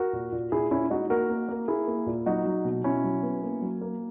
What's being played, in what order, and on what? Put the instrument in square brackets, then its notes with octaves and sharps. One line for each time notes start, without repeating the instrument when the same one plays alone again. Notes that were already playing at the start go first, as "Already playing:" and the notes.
Already playing: [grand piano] F#4 A#4
A#2
A#2
A#2 E4 G#4
A#2 C#4 E4
G#3 D#4 F#4
A#3 F#4 A#4
A#3
A#3
A#3 E4 G#4
A#3
A#2
F#3 D#4 F#4
F#3
B2
B2 C#4 E4
F#3
B3
A#3
F#3
A#3